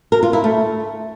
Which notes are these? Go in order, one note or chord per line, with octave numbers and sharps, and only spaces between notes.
A#4
F4
E4
A3